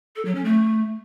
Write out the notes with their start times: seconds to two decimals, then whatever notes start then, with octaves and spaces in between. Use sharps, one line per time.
0.16 A4
0.25 F#3
0.35 C#4
0.45 A3